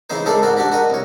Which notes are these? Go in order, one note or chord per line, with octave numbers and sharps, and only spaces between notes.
C#3 E3 C4 D#4 C5
C#3 G#3 A4 A#4 D5 G5
G#2 C4 F#4 A#4
D4 F#4 G4
F#4 A#4 D#5
C2 C#5